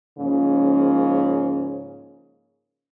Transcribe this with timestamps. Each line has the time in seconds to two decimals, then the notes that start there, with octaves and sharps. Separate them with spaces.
0.19 G#2 C#3 F3 A#3 C#4